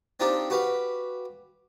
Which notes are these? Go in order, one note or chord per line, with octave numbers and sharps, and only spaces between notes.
C4 D4 D#4 F4 G4
F#4 G4 B4 F5